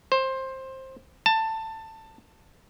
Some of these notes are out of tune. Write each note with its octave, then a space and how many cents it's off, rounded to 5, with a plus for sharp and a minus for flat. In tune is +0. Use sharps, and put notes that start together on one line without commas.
C5 +15
A5 +15